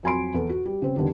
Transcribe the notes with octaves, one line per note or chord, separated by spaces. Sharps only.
F2 F#3 G#5 B5 C6 D7
E2 A4
F#4
G3
C#3 C4
E2 D3 D#3 G3